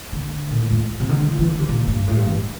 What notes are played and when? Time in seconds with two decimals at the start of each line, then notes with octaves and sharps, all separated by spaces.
0.13 D3
0.51 A#2
0.60 A2
0.71 F2
1.00 C3
1.09 D3
1.20 G3
1.30 F3
1.39 E3
1.49 D3
1.59 C3
1.69 A#2
1.88 G2
2.08 A2
2.16 G2
2.26 E2